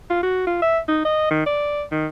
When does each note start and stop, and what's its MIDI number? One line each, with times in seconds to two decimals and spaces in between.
0.10 0.21 65
0.23 0.44 66
0.47 0.57 65
0.62 0.79 76
0.88 1.03 63
1.05 1.26 75
1.31 1.42 51
1.46 1.83 74
1.92 2.07 51